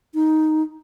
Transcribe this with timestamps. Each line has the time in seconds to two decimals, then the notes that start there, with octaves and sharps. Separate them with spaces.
0.14 D#4